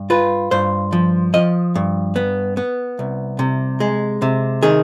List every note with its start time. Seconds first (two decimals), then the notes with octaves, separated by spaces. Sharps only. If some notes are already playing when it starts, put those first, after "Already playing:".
Already playing: G2
0.10 F4 B4
0.51 G2 C5
0.92 F3
1.34 F3 D#5
1.75 G2
2.16 B3
2.57 B3
2.99 C2
3.39 C3
3.80 G#3
4.22 C3
4.63 D#3 G#4